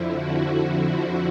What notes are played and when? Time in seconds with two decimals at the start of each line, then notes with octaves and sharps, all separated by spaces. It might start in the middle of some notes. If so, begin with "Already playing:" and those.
Already playing: F2 D3 F3 E4
0.12 F#4